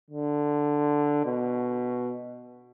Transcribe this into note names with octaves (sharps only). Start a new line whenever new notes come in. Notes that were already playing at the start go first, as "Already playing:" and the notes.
D3
B2